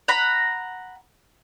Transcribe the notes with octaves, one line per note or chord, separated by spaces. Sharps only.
F#5 A#5 B5